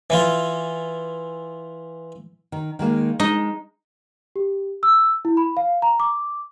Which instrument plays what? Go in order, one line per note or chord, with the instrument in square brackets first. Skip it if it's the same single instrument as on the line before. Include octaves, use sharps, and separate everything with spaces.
[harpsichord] E3 E4 F4
[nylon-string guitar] D#3
D#3 G#3 A#3
[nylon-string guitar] G#3 [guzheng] D#4 D#5
[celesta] G4
E6
E4
B5
F5
A#5
D6